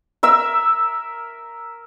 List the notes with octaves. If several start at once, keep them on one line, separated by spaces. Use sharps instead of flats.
A#4 E5 E6